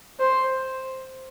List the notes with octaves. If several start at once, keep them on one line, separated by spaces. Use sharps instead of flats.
C5